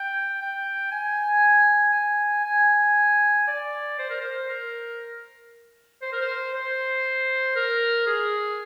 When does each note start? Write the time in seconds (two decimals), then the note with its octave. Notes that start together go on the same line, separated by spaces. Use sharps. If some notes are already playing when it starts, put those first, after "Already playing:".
Already playing: G5
0.42 G5
0.91 G#5
1.94 G#5
2.45 G#5
3.47 D5
3.99 C5
4.10 A#4
4.21 C5
4.49 A#4
6.02 C5
6.12 A#4
6.21 C5
6.54 C5
7.56 A#4
8.07 G#4